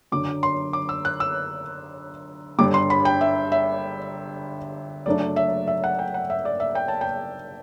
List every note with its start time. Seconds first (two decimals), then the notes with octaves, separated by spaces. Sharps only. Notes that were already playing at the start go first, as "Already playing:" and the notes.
0.12 F#2 D3 F#3 D6
0.43 C6
0.73 D6
0.89 E6
1.05 F#6
1.20 E6
2.58 G1 G2 D3 G3 D6
2.74 C6
2.90 B5
3.05 G5
3.21 E5
3.52 E5
5.06 F#1 F#2 F#3 A3 D4 D5
5.36 E5
5.68 E5
5.84 F#5
5.99 G5
6.14 F#5
6.30 E5
6.45 D5
6.60 E5
6.75 G5
6.88 A5
7.01 G5